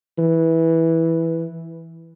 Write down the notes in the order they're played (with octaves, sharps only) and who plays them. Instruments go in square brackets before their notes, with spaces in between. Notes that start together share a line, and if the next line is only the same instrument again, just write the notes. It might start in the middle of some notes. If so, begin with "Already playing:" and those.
[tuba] E3